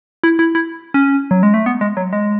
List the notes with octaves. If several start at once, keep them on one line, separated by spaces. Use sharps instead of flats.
E4
E4
E4
C#4
F#3
G#3
A3
B3
G#3
F#3
G#3